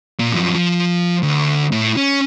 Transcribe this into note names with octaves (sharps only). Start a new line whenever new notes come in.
A#2
F#2 F3
F3
D2
A2
C#4